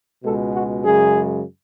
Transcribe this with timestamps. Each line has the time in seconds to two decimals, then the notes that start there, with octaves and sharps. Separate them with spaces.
0.24 C#2 B2 G#3 A4
0.53 F#4
0.84 F#2 C#3 G#3 G#4